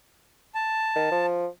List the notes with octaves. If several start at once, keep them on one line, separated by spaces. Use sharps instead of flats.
A5
D#3
F3